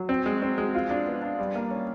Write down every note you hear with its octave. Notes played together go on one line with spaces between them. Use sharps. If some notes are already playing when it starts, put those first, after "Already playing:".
Already playing: F#3
C4
G#3
C4
G#3
F4
D4
B3
D4
G3
A#3
C#4